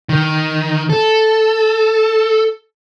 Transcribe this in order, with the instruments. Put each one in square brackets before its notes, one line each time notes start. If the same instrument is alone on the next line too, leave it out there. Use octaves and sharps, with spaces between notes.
[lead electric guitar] D#3
A4